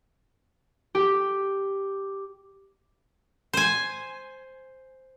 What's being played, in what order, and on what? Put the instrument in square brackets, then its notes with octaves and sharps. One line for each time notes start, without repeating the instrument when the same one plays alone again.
[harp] G4
[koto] C5 G#5